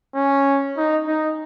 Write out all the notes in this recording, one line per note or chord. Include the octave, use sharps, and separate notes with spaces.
C#4
D#4
D#4